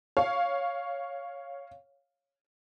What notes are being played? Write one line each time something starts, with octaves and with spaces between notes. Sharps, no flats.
C#5 F5